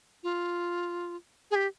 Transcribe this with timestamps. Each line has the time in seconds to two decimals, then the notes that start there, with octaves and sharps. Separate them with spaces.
0.23 F4
1.51 G#4
1.55 G4